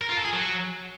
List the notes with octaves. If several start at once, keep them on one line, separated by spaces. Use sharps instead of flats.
A#4
F4
A4
G#4
F#3